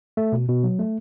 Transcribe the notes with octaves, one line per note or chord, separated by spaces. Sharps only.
A3
B2
B2
F#3
A3